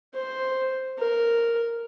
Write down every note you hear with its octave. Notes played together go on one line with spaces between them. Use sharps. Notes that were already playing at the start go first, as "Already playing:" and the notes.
C5
A#4